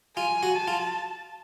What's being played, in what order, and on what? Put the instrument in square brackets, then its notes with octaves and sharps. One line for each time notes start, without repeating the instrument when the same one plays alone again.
[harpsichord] F4 [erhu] G#5
[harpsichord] F#4
[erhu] A5
[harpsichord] F4